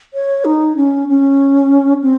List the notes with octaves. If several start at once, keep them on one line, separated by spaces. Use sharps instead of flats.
C#5
D#4
C#4
C#4
C4